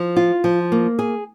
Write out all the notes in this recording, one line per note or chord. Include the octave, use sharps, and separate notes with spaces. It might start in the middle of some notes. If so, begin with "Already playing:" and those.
Already playing: F3
F4
F3
A#3
G#4